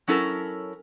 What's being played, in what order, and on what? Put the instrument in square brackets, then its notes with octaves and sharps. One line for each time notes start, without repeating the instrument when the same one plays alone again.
[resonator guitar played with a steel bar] F#3 C#4 E4 A4 A#4